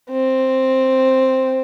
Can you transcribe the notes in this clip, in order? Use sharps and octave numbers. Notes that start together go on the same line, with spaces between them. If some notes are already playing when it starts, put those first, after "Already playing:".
C4